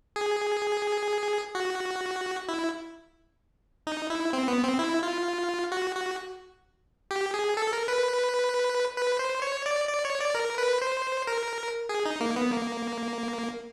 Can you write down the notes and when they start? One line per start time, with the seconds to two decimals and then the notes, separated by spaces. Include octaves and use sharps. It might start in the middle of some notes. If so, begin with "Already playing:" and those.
0.16 G#4
1.55 F#4
2.48 E4
3.87 D#4
4.10 E4
4.33 C4
4.48 B3
4.63 C4
4.79 E4
5.03 F4
5.72 F#4
5.96 F#4
7.11 G4
7.34 G#4
7.57 A4
7.73 A#4
7.88 B4
8.97 B4
9.19 C5
9.42 C#5
9.66 D5
9.89 D5
10.05 C#5
10.20 D5
10.35 A#4
10.58 B4
10.82 C5
11.27 A#4
11.89 G#4
12.06 D#4
12.21 A#3
12.36 B3
12.52 A#3